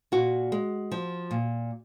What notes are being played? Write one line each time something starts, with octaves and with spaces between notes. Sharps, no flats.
A#2 F#4
G#3
F3
A#2